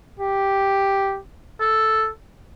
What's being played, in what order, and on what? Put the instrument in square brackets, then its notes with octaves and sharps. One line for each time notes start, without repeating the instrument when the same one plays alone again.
[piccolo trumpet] G4
A4